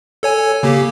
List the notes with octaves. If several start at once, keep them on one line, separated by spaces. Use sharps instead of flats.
A4 C#5 G#5
C#3 A#3 G4